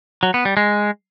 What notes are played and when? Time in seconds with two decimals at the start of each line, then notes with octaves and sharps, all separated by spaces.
0.23 F#3
0.34 B3
0.45 G3
0.57 G#3